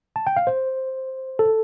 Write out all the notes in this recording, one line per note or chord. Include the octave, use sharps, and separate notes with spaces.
A5
G5
F5
C5
A4